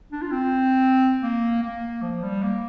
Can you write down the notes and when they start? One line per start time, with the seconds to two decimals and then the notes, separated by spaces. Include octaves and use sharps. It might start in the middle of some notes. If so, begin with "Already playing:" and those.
0.12 D4
0.22 F4
0.32 C4
1.23 A#3
1.63 A#3
2.02 F3
2.23 G3
2.43 A#3